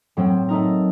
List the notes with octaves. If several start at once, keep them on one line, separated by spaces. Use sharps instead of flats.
A2 F#3 C4
A3 D#4 A#4